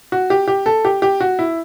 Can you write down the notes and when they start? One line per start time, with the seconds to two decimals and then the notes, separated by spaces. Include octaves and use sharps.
0.12 F#4
0.30 G4
0.48 G4
0.66 A4
0.85 G4
1.02 G4
1.20 F#4
1.39 E4